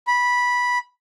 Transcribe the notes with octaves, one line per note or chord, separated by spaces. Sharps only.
B5